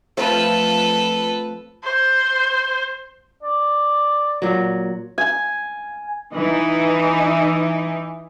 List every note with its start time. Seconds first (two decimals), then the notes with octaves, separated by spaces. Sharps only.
0.17 F3 A3 C4 A4 B4
1.84 C5
3.43 D5
4.42 A#2 F#3
5.18 G#5
6.33 E3 D#4